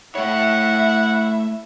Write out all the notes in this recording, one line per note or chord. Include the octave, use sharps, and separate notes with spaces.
A3 E4 C#5 E5 F#5